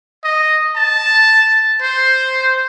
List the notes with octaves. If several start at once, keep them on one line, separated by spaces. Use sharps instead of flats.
D#5
A5
C5